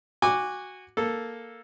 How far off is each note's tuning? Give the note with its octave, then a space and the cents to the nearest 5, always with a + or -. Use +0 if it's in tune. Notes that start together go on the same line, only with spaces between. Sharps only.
F#4 +0 G#5 -25 D6 +0
A#3 +0 A4 +0